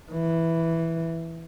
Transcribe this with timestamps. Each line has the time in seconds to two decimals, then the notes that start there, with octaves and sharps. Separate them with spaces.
0.12 E3